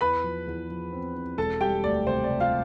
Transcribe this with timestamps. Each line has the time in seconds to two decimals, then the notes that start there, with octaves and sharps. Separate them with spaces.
0.01 E2 B4 B5
0.24 F3
0.47 E2
0.70 F3
0.92 C4
1.15 C4
1.38 E1 A4 A5
1.61 G3 G4 G5
1.83 D2 D5
2.06 C3 C5
2.24 D5
2.30 C3
2.40 F4 F5